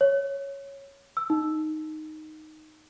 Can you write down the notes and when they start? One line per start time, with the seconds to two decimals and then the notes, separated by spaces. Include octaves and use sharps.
0.01 C#5
1.17 E6
1.30 D#4